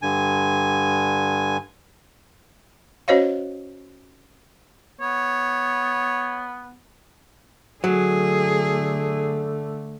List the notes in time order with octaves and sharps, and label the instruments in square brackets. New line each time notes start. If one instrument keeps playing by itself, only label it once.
[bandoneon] G2 D3 G#5
[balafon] C#4 F#4 C5 C#5 D#5 F5
[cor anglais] B3 [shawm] C#5
[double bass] D3 A3 [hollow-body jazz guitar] F#3 [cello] G#4